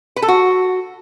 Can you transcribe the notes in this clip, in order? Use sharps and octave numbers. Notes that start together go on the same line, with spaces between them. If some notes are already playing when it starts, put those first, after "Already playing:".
B4
A4
F#4